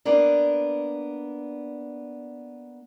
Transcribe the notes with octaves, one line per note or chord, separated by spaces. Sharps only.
A#3 B3 D4